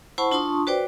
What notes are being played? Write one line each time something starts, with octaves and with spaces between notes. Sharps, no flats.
E4 C5 F#5 A5 B5 C#6
D4 F4 A5 C6 C#6 D#6
F#4 B4 C5 D5 G5 D6